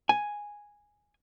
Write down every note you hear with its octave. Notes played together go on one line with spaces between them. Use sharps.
G#5